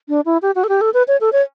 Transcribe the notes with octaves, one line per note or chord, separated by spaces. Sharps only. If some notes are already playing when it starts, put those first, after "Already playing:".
D4
E4
G4
F#4
A4
G4
A4
B4
C#5
A4
C#5